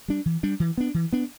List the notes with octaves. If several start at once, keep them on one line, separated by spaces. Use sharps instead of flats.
G3 D4
E3
G3 D4
E3
B3 D4
E3
B3 D4